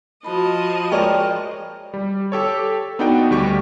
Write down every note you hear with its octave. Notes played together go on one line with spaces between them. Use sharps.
F3 F#4 D#5 A5 B5
G#3 A#4 C#5 D5 G5
G3
G4 A4 C#5
B3 D4 D#4 F#4 B4 G5
D2 G3 G4 C#6